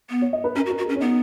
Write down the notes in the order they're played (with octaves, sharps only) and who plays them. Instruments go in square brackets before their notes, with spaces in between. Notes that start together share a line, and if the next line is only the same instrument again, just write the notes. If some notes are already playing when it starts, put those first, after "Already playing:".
[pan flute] B3
[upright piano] C#5
D#5
B4
[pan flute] C#4 [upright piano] A#4
[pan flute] F#4
[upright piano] A#4
[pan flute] F#4
[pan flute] C#4 [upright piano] G#4
[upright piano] C#4
[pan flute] B3 [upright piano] D#4